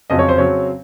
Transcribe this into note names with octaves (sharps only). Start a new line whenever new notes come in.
F2 C#3 F#3 C4 D#5
C#5
C5
C#3 F#3 C4 C#5